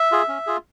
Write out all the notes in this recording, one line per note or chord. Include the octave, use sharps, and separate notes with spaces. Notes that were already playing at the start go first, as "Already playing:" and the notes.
Already playing: E5
F4 G#4
C#4
F4 G#4